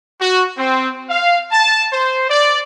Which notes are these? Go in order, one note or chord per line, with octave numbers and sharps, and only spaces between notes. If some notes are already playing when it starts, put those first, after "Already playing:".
F#4
C4
F5
A5
C5
D5